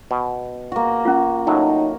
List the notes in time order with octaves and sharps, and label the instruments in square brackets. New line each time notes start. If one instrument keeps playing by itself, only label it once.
[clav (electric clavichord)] B2
[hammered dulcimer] A#3 F#4
[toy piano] C#4 F4
[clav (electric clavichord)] A2 F#3 [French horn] D#4